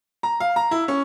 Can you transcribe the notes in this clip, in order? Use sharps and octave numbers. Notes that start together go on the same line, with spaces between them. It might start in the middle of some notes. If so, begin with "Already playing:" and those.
A#5
F5
A#5
E4
C#4